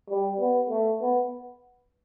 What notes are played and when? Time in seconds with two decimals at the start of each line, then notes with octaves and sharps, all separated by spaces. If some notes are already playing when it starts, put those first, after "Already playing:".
0.09 G3
0.40 B3
0.70 A3
1.01 B3